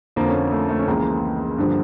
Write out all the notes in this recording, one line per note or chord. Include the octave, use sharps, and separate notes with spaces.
F2 D3 F3 A#3
C#4
A#3
A3
A3
C#4
C#2 C#3 E3 A#3
G2 D3 F3